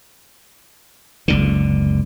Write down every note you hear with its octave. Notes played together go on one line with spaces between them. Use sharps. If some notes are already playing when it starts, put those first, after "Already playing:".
F#1 C#2 D3